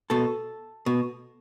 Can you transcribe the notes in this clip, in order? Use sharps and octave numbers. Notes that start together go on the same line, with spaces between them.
B2 A4
B2